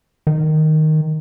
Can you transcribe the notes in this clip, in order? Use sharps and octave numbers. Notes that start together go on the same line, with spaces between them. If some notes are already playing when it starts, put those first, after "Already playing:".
D#3